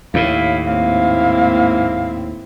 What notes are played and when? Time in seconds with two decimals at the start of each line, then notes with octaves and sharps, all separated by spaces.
0.14 D#2 A2 E4 F5
0.65 G#2 A#3 C4 E4 F5